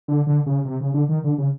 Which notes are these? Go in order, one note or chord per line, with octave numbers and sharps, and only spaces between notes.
D3
D3
C#3
C3
C#3
D3
D#3
D3
C#3